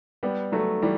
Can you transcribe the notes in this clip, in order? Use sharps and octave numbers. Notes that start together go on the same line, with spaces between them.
G3 B3
F#3 A3
E3 G3